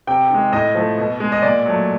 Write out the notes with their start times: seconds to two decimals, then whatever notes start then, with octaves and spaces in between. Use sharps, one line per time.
0.07 C3 G5
0.30 D#3 G#3
0.52 A2 D#5
0.75 F3 A3
0.98 B2
1.20 G#3
1.32 D#5
1.42 A#2 D5
1.66 F#3 A3